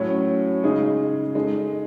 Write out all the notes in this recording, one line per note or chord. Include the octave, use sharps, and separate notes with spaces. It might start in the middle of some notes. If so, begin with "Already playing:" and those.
Already playing: A2 F#3 C#4
C#3 G#3 D#4 G#4
G#3 D#4 A4